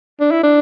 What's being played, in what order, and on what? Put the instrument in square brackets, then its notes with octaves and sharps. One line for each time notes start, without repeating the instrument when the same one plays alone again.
[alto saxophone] D4
E4
D4